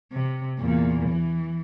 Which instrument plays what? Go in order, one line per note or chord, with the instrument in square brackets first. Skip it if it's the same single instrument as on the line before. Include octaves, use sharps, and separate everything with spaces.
[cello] C3
E2 A#2
E3